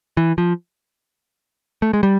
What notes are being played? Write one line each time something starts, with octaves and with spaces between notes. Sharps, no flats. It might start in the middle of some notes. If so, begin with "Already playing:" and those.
E3
F3
A3
G#3
G3